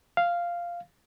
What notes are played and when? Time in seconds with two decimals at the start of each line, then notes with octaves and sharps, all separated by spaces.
0.17 F5